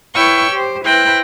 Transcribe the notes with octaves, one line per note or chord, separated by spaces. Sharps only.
E4 B4 C#5 G5 C#6 E6
G4 C5
E4 B4 C5 G5 F#6 A#6